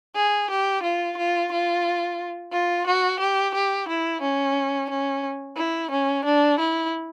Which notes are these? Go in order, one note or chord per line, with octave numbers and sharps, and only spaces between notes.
G#4
G4
F4
F4
F4
F4
F#4
G4
G4
E4
C#4
C#4
E4
C#4
D4
E4